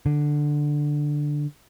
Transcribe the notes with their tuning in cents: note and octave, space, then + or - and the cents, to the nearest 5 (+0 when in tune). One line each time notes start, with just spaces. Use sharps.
D3 +5